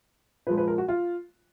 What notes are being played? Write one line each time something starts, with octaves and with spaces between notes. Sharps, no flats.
A#2 F3 G#3 B4
B4
A#4
F#4
F4